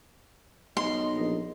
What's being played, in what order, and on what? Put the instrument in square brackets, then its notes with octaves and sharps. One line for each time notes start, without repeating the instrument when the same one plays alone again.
[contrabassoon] B1 [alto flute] D#5 [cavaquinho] C6
[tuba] A#1